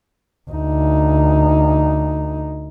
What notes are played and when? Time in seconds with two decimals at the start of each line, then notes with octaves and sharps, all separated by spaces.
0.50 D2 D#4